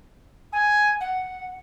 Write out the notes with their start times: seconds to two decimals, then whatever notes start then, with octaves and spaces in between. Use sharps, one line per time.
0.52 G#5
1.00 F#5